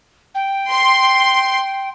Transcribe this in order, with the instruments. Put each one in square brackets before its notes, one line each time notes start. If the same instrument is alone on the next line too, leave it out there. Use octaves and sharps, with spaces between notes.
[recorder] G5
[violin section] C6